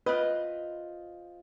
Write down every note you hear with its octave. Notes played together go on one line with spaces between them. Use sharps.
C4 F4 B4 D#5